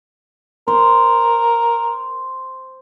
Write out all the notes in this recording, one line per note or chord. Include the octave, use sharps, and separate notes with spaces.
A#4 C5